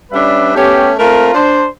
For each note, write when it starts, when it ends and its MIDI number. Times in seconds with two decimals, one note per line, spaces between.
0.12 0.54 55
0.12 0.54 61
0.12 0.54 62
0.12 0.54 71
0.12 0.54 76
0.55 0.92 57
0.55 0.92 59
0.55 0.92 61
0.55 0.92 67
0.98 1.34 57
0.98 1.34 60
0.98 1.34 65
0.98 1.34 70
1.34 1.65 62
1.34 1.65 72